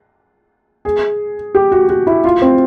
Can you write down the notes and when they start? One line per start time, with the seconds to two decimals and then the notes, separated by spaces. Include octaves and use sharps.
0.85 G#4
1.55 G4
1.72 F#4
1.89 F#4
2.07 E4
2.24 F4
2.42 C4